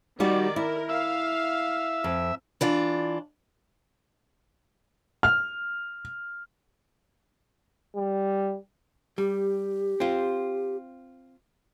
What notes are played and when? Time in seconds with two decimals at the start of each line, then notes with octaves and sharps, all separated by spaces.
0.20 D#3 G3 D#4 F#4 G4 D5
0.56 E4 A#4
0.89 E5 F5
2.04 F2
2.61 E3 D4 F4
5.23 F6
7.96 G3
9.18 G3 G4
10.00 C4 F4